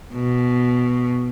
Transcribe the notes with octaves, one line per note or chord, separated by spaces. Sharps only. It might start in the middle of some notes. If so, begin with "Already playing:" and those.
B2